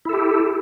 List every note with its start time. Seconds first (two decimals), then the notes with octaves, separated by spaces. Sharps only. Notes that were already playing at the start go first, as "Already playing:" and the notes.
0.05 E4
0.09 A4
0.13 G4